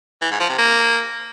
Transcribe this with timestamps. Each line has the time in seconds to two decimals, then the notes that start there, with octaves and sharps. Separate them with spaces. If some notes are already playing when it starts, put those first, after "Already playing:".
0.22 E3
0.31 G#2
0.40 F3
0.49 C3
0.58 A#3